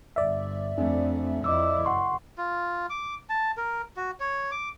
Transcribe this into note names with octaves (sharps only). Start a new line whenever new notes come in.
G1 D5 E5
F2 A3 C4 D4
F2 E4 D#5 D6 E6
F#1 F#2 F#5 C6 C#6
F4
D6
A5
A#4
F#4
C#5
D6